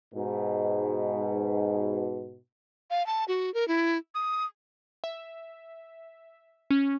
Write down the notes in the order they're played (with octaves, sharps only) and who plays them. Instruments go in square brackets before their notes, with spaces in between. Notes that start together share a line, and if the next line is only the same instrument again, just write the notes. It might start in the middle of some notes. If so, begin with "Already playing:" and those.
[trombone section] G#2 B2
[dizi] F5
A5
F#4
A#4
E4
D#6
[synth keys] E5
C#4